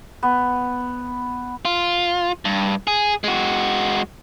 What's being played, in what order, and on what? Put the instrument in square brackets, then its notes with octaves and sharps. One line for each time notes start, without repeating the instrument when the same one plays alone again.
[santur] B3
[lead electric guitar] F4
G2
G#4
G#3 F#4